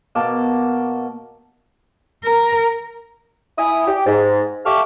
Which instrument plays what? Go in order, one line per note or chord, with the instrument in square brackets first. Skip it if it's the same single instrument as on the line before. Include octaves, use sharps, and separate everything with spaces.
[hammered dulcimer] B2 A#3 A5 D6
[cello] A#4
[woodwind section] E4 G#5 D#6
G4
G#2
G4 A4 E5 F5 C#6 D6